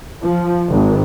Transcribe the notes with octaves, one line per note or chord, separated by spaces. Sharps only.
F3
G#1